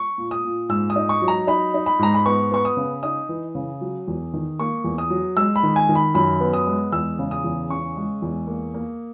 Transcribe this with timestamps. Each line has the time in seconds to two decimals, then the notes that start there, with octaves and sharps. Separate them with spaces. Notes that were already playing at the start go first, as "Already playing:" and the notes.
Already playing: C#6
0.18 A#2
0.31 D#6
0.44 A#2
0.69 G#2 E6
0.90 D#6
0.96 D#4
1.09 C#6
1.22 F#3
1.28 A#5
1.47 D#4 B5
1.74 D#4
1.86 B5
1.99 G#2 A#5
2.14 B5
2.26 B3 C#6
2.51 B3 C#6
2.65 D#6
2.77 C#3
3.03 D#4 D#6
3.29 E3
3.55 C#3
3.81 F#3
4.08 E2
4.33 D#3
4.60 A#3 C#6
4.84 E2
4.98 D#6
5.10 F#3
5.37 G#3 E6
5.56 B5
5.63 D#3
5.76 G#5
5.89 D#3
5.95 B5
6.14 F#2 B5
6.40 B3
6.53 D#6
6.67 G#3
6.92 E2 E6
7.19 C#3
7.31 D#6
7.44 E2
7.70 C#3 C#6
7.97 G#3
8.22 E2
8.47 A#3
8.74 A#3